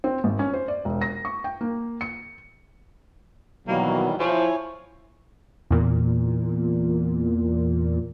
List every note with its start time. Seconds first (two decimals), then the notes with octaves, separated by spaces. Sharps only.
0.04 C4
0.24 G#1
0.39 C#4
0.53 C5
0.68 D5
0.85 E1
1.01 A#6
1.25 C#6
1.44 G5
1.61 A#3
2.01 C#7
3.68 B2 D#3 E3 F#3 G3 A#3
4.20 F3 E4 C#5 G#5
5.71 E2 A#2